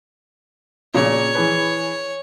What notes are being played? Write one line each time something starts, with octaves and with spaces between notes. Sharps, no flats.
A#2 C#3 D4 C#5
E3 G#4 B4